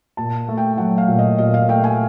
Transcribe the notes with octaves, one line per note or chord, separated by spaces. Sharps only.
A#2 A5
A3
G5
F#3 F#5
F5
A#2
D#5
A#2 D#5
F5
A3 G5
G#5